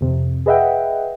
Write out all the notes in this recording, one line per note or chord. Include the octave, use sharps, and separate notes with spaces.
F2 C3
G#4 B4 D#5 E5 F#5 G5